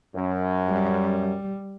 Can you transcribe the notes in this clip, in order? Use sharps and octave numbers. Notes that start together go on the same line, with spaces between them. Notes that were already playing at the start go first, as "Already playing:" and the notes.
F#2
G3